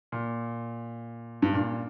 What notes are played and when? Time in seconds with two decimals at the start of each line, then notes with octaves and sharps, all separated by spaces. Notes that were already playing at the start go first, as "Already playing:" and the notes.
0.12 A#2
1.42 G2
1.53 A#2